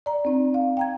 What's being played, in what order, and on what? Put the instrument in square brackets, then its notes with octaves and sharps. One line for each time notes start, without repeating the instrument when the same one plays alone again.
[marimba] D5 A#5
C4 D#4
F5
G5 A#5 G#6